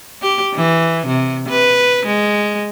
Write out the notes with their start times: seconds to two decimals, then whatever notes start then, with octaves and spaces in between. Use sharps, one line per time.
0.22 G4
0.54 E3
1.06 C3
1.48 B4
2.06 G#3